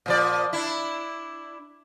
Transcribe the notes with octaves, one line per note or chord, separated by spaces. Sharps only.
A#2 F3 D5
D4 E4